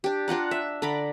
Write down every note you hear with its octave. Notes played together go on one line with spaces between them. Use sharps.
D4 G4
D4 F4 F#5 A#5
E5
D3 D5 A#5 B5